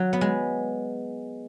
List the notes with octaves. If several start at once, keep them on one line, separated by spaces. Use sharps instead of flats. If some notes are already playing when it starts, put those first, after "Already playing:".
Already playing: F#3
B3
G#3